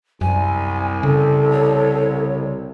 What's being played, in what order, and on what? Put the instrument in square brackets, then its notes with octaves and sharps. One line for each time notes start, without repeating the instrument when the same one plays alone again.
[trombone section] C2 [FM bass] F#2 [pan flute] G#5
[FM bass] C#3 [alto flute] A4
[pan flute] C#5